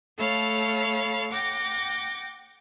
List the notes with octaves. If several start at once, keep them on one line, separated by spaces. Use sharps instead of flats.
A3 A4 C#5 F5 B5 A6
F#5 G5 D6 A6 A#6